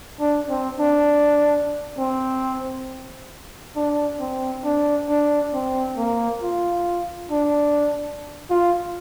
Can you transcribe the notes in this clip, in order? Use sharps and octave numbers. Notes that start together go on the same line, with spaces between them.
D4
C4
D4
C4
D4
C4
D4
D4
C4
A#3
F4
D4
F4